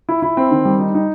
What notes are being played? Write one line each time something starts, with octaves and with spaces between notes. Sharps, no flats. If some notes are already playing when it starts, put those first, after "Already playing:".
E4
E4
C4
D#3
G3
D#4
D#4